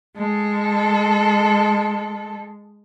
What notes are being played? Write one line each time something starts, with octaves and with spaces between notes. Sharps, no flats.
G#3 A4